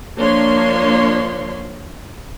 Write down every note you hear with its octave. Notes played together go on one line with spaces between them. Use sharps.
F3 A#3 D4 C#5 C6